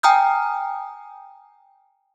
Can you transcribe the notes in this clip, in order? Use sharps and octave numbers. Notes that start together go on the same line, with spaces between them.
G5 G#5 A#5 D#6 F6 G6